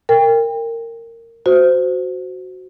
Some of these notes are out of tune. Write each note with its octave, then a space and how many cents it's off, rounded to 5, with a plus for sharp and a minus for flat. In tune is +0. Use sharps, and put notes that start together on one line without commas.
A#4 -20 G5 +30
F#4 +0 C5 -20